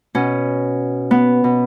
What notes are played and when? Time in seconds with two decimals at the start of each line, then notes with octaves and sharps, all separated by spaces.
0.15 B2 C#4
1.11 B3
1.44 B2